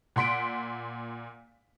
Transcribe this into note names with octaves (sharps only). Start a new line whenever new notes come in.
A#2 F#5 C6 B6 D7